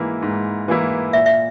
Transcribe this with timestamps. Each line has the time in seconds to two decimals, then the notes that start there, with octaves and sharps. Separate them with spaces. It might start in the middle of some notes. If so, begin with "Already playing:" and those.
Already playing: G#2 E3 A#3 E4
0.22 G#2
0.68 E3 A#3 E4
1.13 A#2 E5
1.26 E5